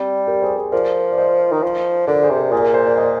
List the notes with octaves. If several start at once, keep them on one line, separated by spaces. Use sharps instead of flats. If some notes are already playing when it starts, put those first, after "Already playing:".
Already playing: G3 C4
G4 A#4
G#4 C5
G#4 C5
F3 A#4 D5
D5
C5 D#5
D#3
F3
D3 A#4 D5
G#4 C5
C3
A#4 D5
A#2 G#4
A#4
C5
D5
C5 D#5